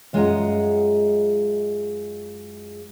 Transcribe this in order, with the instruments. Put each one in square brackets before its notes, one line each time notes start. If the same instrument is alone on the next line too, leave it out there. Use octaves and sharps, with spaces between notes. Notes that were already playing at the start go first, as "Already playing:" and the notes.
[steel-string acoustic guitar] F#2 G#3 F4 D#5 F#5 A#5